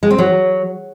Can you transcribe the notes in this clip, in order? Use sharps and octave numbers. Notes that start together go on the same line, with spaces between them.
G#3
C4
F#3